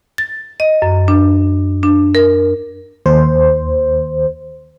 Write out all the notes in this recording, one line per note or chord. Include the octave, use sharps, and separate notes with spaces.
A6
D#5
F#2
D4
D4
A#4
D#2 C5